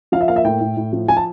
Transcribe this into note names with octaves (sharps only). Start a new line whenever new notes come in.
F3 F5
E5
A#3 F5
E5
A2 G5
A2
A2
F3
F3 G#5
A5